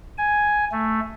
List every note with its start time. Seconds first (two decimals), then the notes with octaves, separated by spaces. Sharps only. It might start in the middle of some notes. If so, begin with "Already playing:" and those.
0.18 G#5
0.72 A3